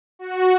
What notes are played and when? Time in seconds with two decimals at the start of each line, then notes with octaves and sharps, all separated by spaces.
0.19 F#4